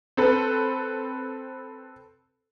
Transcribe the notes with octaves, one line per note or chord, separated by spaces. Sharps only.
C4 A4 B4